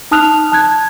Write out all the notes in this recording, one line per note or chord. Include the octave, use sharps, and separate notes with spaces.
D#4 A5 D#6 F6 F#6 F7
A5 F#6 G#6